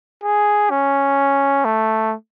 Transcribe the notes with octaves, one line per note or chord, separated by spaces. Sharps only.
G#4
C#4
A3